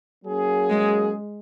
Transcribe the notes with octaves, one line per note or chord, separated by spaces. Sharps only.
F#3 A#3 C#4 G#4
G#3